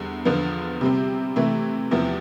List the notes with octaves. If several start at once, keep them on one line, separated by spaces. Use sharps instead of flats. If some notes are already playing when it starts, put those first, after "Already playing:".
Already playing: E2 D3 G3
E2 D3 F3 B3 F4
C3 G3 C4
C3 E3 A3
E2 C3 F3 B3 E4